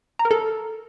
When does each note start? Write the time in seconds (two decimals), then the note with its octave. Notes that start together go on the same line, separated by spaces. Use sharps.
0.19 A#5
0.25 A#4
0.31 A4